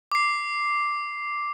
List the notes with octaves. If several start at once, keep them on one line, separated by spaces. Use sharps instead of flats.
D6 C7